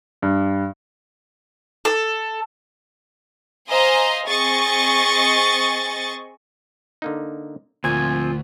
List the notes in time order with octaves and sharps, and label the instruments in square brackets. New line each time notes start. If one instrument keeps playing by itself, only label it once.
[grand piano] G2
[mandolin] A4
[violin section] C5 D#5 F5 G#5 A#5 C6
C4 G#4 D#5 C#6 A6
[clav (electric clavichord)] D3 A#3 D#4
[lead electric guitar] D2 [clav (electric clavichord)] A#2 [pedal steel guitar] F3 C4 G#5 [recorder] F4